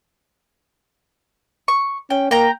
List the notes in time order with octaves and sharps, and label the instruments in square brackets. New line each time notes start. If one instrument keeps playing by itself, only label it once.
[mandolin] C#6
[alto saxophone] C#4 [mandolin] G5
[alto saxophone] A#3 [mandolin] G5 A#5